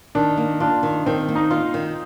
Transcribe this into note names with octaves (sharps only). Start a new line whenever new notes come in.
D#3 D4
A#3
D4 F4
D#3
D#3 C4
A#3
D#4
F4
D#3